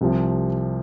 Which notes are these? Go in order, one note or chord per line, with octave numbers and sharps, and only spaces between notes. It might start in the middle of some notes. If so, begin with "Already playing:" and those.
C2 C3 F3